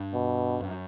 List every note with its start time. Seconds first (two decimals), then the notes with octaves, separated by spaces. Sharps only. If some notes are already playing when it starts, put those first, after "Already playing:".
Already playing: G2
0.14 B2
0.61 F#2